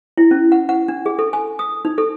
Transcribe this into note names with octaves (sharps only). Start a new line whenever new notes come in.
E4
C#4
F#5
F#5
D4
G#4
A4
G#5
D#6
D#4
A4